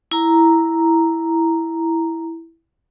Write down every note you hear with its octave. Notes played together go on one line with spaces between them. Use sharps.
E4 A#5